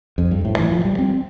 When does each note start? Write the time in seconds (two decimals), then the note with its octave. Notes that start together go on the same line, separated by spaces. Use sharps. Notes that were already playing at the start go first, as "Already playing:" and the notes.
0.18 F2
0.31 G2
0.45 A2
0.58 E3
0.72 F3
0.85 G3
0.99 C4